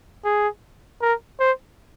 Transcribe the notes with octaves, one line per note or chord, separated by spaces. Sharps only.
G#4
A#4
C5